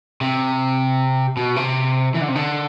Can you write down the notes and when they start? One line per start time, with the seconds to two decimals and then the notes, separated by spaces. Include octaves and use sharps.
0.21 C3
1.37 B2
1.56 C3
2.14 E3
2.21 D3
2.28 C3
2.35 D3